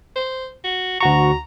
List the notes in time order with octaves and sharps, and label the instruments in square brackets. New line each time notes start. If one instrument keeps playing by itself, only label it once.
[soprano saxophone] C5
F#4
[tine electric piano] D2 F#4 C#6 [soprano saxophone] A#5